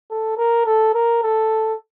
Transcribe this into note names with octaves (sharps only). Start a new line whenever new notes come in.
A4
A#4
A4
A#4
A4